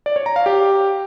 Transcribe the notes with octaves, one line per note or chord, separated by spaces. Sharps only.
D5
C#5
A#5
F5
G4